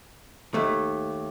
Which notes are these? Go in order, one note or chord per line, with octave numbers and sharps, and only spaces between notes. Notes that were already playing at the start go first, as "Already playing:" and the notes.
D#2 A3